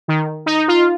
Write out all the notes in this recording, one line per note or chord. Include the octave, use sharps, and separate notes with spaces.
D#3
D#4
F4